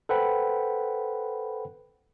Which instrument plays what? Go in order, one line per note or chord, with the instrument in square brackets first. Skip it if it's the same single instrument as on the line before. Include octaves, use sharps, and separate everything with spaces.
[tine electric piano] A4 B4 C5 F#5 G5 B5